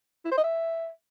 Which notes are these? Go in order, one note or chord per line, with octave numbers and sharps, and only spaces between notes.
E4
C5
D#5
E5